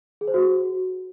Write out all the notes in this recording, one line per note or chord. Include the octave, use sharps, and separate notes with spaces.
G#4
C5
F#4